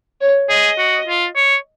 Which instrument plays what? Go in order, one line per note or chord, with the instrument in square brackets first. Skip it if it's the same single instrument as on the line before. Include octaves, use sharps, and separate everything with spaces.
[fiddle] C#5
[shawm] G#4 [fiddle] D#5
[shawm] F#4
F4
C#5